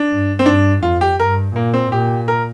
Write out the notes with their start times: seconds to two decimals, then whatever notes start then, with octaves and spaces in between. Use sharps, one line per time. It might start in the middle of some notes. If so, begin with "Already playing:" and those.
Already playing: D4
0.11 G2
0.39 C4
0.46 G2 D4
0.82 F2 F4
1.01 G4
1.19 G2 A#4
1.55 A#2 A#3
1.74 C4
1.91 A#2 G4
2.28 A#4